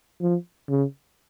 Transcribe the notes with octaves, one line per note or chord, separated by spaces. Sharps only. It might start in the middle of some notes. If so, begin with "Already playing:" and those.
F3
C#3